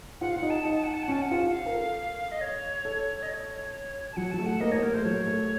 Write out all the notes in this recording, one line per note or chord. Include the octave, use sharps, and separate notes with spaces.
F4 F#5
F5
F4 F#5
D#4
A5
D#4 F#5
A5
F#5
A5
F#5
C#4 A5
F#5
F4
F5
A#4
A4
D#5
C#5
A4
D#5
C#5
A5
F#3 F#5
F#3 A5
A3
F#5
A#3 D#5
A#3 C#5
A#3 A#4
A3 C5
F#3 C#5
A3